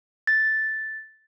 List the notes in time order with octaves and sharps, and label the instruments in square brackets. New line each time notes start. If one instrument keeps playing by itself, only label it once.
[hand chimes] A6